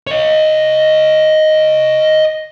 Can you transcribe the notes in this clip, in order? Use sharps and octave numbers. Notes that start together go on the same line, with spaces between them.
C#5 D#5